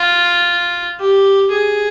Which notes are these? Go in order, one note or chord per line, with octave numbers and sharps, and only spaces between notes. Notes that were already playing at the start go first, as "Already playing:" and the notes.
Already playing: F4
G4
G#4